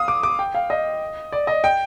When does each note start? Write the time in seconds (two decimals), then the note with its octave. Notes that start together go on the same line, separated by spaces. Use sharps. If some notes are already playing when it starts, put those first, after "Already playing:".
Already playing: F5 D#6
0.08 D6
0.23 D6
0.39 G5
0.55 F5
0.70 D#5
1.32 D5
1.47 D#5
1.64 G5